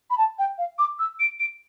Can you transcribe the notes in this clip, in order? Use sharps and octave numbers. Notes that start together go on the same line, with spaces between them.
B5
A5
G5
F5
D6
E6
D7
D7